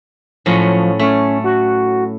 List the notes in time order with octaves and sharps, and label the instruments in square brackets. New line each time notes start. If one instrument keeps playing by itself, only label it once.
[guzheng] A2 F#3 C#4 [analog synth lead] F3
[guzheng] A3 [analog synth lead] C#4
[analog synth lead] F#4